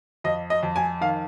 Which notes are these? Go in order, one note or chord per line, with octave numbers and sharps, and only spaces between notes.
F2 D#5
D#5
F2
G#5
D#3 F5